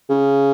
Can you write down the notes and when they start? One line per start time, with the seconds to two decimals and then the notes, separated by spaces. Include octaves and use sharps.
0.09 C#3